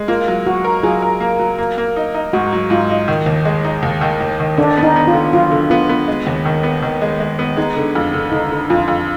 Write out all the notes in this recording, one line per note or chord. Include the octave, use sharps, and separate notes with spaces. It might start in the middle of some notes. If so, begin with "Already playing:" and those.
Already playing: G#3
A#3 F4
F#3
F#3 F#4
A#4
F#3 F4 G#4
A#4
A#3
F#3
A#3
A#3
D#4
D#4
G#2 F#4
F#3
G#2 F4
D#4
D#3
D#2
G#3
D#4
D#2
D#3
D#2
D#3
D3 D4
B3
D#4
B3
F4
D3
F#3 F4
D3
B3 F4
B3
G#3
D#2
D#3
B3
D#3
G#3
G#3
B3
G#3 D#4
D3
F2
D3
D3 D#4
D3
F2 F4
F2